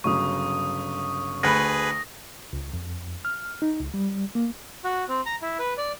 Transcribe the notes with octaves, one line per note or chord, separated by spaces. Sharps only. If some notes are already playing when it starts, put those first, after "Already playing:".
G1 C#3 F#3 C#6 D#6
D2 G#4 B4 B5 D#6 A#6
C#2
F2
F6
D#4
C#2
G3
A#3
F#4
C4
A#5
E4
B4
D5